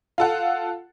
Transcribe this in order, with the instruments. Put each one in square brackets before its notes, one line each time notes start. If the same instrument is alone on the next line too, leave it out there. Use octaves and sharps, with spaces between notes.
[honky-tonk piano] F4 A4 F#5